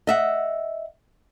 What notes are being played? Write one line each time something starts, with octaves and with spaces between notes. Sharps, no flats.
D#5 E5 F#5